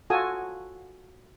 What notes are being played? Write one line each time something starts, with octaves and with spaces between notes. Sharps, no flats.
F4 F#4 A4 G#5 D#6